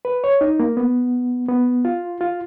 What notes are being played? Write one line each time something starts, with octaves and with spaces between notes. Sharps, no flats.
B4
C#5
D#4
A#3
B3
B3
F4
F4